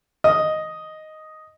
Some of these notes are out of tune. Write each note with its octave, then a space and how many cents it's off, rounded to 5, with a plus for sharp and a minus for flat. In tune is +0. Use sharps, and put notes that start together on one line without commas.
D#5 +0